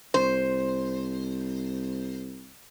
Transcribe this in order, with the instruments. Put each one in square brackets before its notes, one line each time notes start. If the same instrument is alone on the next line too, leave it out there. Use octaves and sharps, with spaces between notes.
[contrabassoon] C2 [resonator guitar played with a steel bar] C5